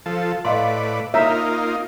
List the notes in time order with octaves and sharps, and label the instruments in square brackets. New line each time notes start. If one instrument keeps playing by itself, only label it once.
[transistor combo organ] F3 A4
[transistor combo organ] A2 B4 D5 [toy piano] D#5 F5 C6
[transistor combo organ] A#3 D#4 F4 [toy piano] C#5 A#5 [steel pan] E5